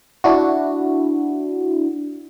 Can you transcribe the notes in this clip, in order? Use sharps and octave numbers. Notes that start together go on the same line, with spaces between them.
D4 E4 F#4